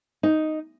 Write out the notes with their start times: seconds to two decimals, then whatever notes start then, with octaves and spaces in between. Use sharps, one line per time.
0.23 D#4